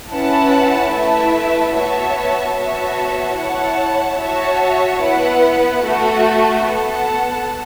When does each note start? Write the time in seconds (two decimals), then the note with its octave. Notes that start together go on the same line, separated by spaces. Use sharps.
0.10 C#4 E4 B4 F#5 A5
0.92 A3 E4 B4 E5 A5
1.74 B3 F#4 C#5 E5 A5
2.56 B3 F#4 C#5 E5 A5
3.37 E4 C#5 F#5 A5
4.20 F#4 C#5 E5 A5
5.02 B3 E4 B4 F#5
5.83 A3 F#4 A4
6.64 B3 A4 F#5 A5